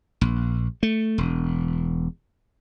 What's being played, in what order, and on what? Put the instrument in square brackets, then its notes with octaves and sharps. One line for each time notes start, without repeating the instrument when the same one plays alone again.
[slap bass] A#1
A3
E1